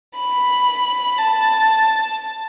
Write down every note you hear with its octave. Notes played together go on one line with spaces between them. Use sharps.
B5
A5